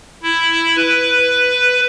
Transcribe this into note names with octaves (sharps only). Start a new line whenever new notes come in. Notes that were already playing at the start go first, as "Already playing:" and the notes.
E4
B4